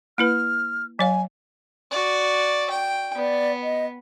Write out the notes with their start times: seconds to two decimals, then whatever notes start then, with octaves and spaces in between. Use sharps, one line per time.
0.18 A#3 E4 B4 F6
0.99 F#3 C#5 F5 G#5
1.91 F#4 D5
2.70 G5
3.16 B3 D5
3.63 D#5